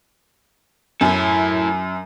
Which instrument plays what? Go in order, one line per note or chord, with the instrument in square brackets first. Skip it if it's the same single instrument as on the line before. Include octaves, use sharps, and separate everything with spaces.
[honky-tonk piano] F#2 [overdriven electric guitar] E4 A4